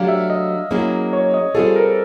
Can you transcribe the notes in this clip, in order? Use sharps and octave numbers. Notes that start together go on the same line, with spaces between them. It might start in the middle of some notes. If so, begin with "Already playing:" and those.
Already playing: F#3 A3 D4 G4 F5
E5
D#5
F#3 A#3 C#4 E4 G#4
C#5
D#5
G3 C4 F4 G#4 A4
A#4